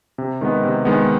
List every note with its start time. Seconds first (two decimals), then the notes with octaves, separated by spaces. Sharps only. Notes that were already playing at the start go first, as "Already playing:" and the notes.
0.18 C3
0.41 D#3 G#3 B3
0.63 C3
0.85 D#3 G#3 B3